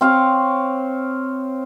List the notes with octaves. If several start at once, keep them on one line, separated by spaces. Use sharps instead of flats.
C4 C#5 F5